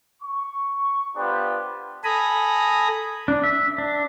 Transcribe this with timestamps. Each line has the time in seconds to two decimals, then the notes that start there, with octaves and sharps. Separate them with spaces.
0.23 C#6
1.16 B3 D4 F4 G4 B4 C5
2.04 A4 G#5 A#5 B5 D#6
3.28 D4
3.44 E5
3.78 D4